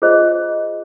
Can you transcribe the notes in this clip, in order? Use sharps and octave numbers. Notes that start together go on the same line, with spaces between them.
F4 G#4 C5 D#5